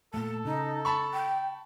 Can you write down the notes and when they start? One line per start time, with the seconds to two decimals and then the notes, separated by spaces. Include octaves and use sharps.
0.14 A#2 A3 A4 A5
0.45 C#3 D#4
0.85 A5 B5 C#6
1.14 G5